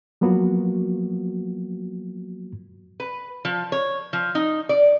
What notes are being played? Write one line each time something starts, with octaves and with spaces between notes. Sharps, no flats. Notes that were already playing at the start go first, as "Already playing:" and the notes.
F3 F#3 A#3 B3 F4 F#4
B4
F3
C#5
F3
D#4
D5